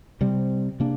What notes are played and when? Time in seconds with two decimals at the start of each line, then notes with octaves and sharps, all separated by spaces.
0.21 C3 G3 C4
0.80 C3 A#3 D4